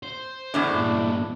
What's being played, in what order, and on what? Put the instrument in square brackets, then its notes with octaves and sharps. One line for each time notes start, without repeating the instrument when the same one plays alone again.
[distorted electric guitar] C5
[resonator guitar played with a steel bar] E2 A2 D4
[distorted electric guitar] G2 A#2